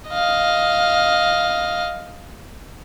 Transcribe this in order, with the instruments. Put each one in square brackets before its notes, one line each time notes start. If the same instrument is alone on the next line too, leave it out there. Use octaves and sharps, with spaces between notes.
[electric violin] D#5 F5